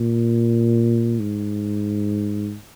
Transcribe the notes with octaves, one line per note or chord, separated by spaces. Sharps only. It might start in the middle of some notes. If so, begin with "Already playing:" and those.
Already playing: A#2
G#2